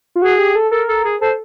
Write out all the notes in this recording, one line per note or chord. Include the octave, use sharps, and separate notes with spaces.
F4
F#4 G#4
G4
A4
A4 A#4
A4
G#4
A4 C5